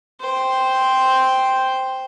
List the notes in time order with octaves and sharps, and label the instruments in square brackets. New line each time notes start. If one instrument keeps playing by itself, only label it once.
[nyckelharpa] C5 G5